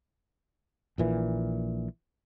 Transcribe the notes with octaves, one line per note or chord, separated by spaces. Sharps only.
A#1 A#2 E3